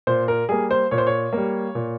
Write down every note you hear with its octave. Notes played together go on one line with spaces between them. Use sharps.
A#2 C5
A#4
G3 A#3 G#4
C5
A#2 C#5
C5
C#5
G3 A#3
A#2